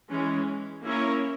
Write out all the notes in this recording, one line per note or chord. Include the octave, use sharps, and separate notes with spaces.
E3 G#3 C#4
A#3 C#4 E4 A#4 C#5